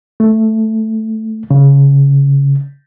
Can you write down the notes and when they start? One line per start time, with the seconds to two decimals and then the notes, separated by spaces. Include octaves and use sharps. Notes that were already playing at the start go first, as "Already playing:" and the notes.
0.20 A3
1.51 C#3